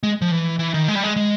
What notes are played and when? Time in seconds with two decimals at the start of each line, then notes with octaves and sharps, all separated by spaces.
0.03 G#3
0.22 F3
0.31 E3
0.59 E3
0.74 D#3
0.88 G#3
0.95 G3
1.04 G#3
1.16 G#3